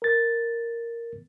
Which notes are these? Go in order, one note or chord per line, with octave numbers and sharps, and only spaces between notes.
A#4 A6